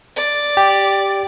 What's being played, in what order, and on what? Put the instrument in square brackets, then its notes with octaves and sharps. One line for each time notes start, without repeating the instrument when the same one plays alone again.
[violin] D5
[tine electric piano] G4